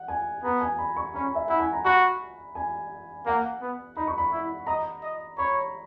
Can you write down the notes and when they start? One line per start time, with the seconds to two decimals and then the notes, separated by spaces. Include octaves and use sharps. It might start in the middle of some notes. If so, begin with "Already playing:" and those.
Already playing: F#5
0.08 G#5
0.44 B3 A#5
0.61 G#5
0.78 B5
0.97 C#6
1.15 C#4 B5
1.35 E5
1.48 E4 F#5
1.60 G#5
1.73 A#5
1.85 F#4 B5
2.55 G#5
3.26 A#3 F#5
3.61 B3
3.97 D#4 B5
4.07 C#6
4.18 B5
4.32 E4
4.67 D#5 A#5
5.03 D#5
5.38 C#5 B5